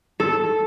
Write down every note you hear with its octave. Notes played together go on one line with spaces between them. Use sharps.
A4